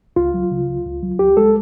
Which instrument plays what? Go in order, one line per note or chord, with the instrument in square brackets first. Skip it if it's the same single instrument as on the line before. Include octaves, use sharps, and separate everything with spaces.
[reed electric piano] C#2 F4
F#3
C#3
C#2
C#2
F#3
C#2 G4
G#3 A4